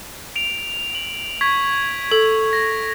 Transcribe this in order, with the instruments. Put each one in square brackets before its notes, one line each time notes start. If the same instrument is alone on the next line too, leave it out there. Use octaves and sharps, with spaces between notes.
[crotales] D7 F7
F#7
C#6 G#6 B6
[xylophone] A4
[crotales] A#6